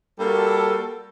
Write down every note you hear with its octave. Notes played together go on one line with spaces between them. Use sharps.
G3 A#3 F#4 A4